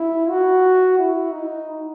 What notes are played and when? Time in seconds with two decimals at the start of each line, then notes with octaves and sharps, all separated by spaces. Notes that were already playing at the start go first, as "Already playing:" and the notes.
Already playing: E4
0.30 F#4
0.98 E4
1.32 D#4